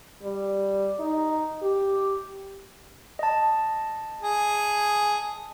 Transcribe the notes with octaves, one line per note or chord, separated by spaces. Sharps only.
G3
D#4
G4
D#5 A5
G#4